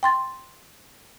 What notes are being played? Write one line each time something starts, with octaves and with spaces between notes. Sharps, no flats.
G5 C6 A6